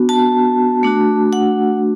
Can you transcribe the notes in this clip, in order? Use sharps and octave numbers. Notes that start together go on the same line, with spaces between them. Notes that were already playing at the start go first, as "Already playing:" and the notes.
Already playing: B3 D4 F#4
A5
A3 D4 F#4
F#5